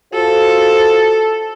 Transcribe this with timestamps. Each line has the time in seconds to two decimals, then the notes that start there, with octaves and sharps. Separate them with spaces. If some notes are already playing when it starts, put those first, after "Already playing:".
0.13 F4 F#4 A4 C5